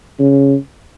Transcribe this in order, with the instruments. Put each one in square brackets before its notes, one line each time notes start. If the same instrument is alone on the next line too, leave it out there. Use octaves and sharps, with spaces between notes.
[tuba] C#3